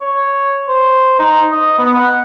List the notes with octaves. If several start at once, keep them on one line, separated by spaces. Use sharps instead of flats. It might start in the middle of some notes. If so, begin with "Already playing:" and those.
C#5
C5
D#4
D#5
B3
F#5